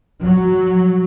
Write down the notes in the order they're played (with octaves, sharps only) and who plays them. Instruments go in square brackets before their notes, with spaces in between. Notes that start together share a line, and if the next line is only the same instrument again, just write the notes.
[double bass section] F#3